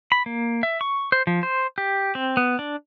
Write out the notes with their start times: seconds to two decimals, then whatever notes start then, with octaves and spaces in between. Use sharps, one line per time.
0.12 B5
0.26 A#3
0.63 E5
0.81 C#6
1.12 C5
1.27 F3
1.43 C5
1.78 G4
2.15 C4
2.37 B3
2.59 D4